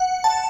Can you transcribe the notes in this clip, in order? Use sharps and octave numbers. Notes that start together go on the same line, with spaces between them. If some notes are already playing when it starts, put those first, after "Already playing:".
Already playing: F#5
A5